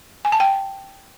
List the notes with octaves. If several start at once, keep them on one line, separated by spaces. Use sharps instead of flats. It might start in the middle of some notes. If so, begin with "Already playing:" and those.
G#5
A5
G5